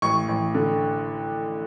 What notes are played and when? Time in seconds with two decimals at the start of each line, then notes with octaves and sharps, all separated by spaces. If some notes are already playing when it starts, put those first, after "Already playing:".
0.02 A1 C#6
0.29 A1
0.54 D3